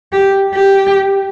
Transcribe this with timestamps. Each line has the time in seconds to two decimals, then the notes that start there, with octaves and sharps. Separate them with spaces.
0.12 G4
0.54 G4